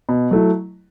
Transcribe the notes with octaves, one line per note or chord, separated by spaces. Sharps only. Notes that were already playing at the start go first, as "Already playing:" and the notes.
B2
F#3 A3 E4